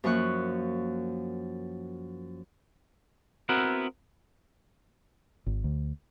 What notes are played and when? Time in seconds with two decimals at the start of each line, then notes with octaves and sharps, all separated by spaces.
0.04 F#2 F3 A#3 C#6 F#6
3.49 B3 C4 E4 F#4 A#4
5.46 G#1
5.64 D2